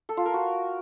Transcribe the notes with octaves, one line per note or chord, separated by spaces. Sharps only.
A4
F4
A#4
F#4